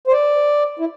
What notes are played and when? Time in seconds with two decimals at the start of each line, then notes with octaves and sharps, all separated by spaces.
0.07 C5
0.12 D5
0.79 E4